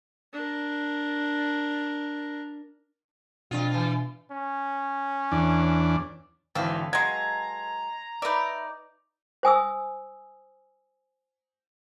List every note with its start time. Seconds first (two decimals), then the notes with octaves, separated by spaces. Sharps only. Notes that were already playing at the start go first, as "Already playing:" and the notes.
0.33 D4 A#4
3.51 F2 B2 D4 F4
3.70 E3 F4
4.31 C#4
5.32 E2 D4
6.55 G#1 D3 E3 C4 A4 B4 F5
6.93 F#3 G#3 A#5 C6 G#6
8.22 D#4 B4 D5 E5
9.43 C5 G#5 D#6 E6